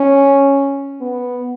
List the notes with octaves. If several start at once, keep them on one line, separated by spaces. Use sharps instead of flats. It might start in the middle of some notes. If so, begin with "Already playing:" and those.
Already playing: C#4
B3